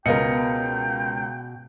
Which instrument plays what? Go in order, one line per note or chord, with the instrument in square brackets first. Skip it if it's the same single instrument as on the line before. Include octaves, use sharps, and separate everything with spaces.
[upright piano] C#2 C#7 [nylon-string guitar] B2 F5 [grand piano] A#4 B4 D#5 [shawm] G5